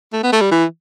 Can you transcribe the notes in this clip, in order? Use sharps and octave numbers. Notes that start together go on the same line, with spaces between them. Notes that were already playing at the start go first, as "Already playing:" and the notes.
A3
B3
A3
G3
E3